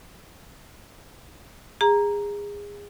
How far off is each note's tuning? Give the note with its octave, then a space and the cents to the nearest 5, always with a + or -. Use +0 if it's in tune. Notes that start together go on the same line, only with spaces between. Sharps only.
G#4 -25 A#5 +0